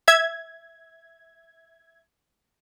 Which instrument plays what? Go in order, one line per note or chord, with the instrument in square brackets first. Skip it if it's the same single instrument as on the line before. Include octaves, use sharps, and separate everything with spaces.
[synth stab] E5 G#6